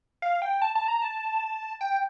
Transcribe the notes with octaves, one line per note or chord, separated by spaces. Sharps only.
F5
G5
A5
A5
A#5
A5
G5